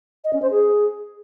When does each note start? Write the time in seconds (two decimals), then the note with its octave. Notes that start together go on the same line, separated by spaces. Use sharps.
0.24 D#5
0.33 C#4
0.42 C5
0.51 G#4